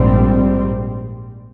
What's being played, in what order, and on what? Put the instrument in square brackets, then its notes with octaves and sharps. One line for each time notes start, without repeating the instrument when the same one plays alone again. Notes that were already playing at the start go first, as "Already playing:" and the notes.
Already playing: [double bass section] A#1 G#2 G3 C4